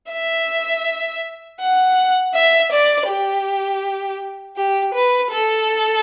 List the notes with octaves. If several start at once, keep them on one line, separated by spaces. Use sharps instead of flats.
E5
F#5
E5
D5
G4
G4
B4
A4